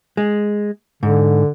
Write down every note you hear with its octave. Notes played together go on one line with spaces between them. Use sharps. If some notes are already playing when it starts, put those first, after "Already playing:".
G#3
G#2 D3